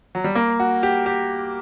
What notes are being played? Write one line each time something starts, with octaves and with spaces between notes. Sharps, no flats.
F#3
G3
A#3
F#4
G4
G4